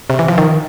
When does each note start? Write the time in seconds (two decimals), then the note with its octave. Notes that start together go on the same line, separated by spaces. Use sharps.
0.10 C3
0.19 E3
0.28 F3
0.38 D#3